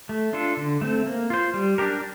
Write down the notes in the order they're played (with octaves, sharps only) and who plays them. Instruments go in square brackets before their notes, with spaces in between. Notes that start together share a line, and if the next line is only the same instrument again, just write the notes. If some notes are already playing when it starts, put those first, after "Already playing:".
[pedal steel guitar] A3
D4 F4 A4
D3
A3 C4
A#3
F4 C5
G3
D4 G4 A#4